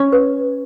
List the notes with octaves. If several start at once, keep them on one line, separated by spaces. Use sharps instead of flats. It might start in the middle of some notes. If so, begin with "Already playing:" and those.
Already playing: C#4
B4